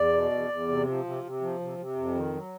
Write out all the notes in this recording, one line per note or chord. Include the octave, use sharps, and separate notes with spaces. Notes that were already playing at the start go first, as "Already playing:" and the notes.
Already playing: E2 D5
B2
E2
E2
C3
F3
C3
C3
F3
C3
C3
F2
D#3
F#3